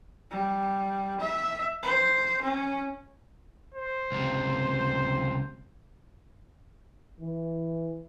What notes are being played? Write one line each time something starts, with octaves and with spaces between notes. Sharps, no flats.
G3
E5
C5
C#4
C5
C#2 C3
E3